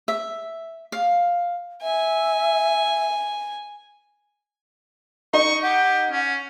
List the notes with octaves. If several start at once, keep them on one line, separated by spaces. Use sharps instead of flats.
E5
F5
E5 G#5
D#4 C#6
G4 F#5
C#4